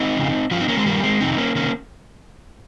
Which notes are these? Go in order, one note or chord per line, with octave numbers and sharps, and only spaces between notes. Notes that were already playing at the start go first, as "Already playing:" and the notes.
Already playing: C4 D#4
F2 C#3 F3
G2 F3 C#4 F4
C4 D#4
A#3 C#4
G#3 C4
G2 D#3 G3 A#3
G#3 C4
F2 C3 D#3 C4 D#4
A#3 C#4
C3 D#3 A#3 C#4